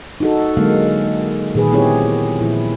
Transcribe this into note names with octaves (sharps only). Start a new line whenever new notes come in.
D#4 F#4 A4
D3 F#3 G#3 A#3 F5
A#2 D#3 G#4 B4
B3 C4 E4 G4 G#4 C#5
A#2 F3 E4